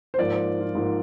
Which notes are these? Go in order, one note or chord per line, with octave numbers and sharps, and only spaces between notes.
C5
G#2 F3 A#3 D5
C5
F4
G#2 F3 A#3